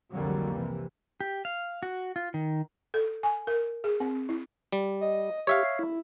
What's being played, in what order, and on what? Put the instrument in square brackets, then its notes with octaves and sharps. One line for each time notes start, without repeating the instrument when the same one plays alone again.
[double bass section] C2 F2 D3 F#3 G3 A#3
C3 E3
[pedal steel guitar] G4
F5
F#4
F4
D#3
[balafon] A4
G#5
A#4
G#4
C4
E4
[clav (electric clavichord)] G3
[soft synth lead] D#5
[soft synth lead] G4 [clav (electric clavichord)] C#5 E5 F5
[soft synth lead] C7
E4